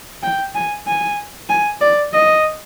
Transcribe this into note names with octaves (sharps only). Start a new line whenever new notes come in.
G5
G#5
G#5
G#5
D5
D#5